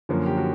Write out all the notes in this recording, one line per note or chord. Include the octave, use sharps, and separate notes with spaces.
F#2 D3 F3 A#3 C#4
G4
F#4